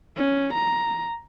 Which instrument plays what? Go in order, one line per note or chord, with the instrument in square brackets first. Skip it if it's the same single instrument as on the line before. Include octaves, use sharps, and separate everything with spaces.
[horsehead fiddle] C#4
A#5